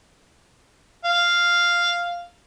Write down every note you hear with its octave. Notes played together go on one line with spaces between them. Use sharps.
F5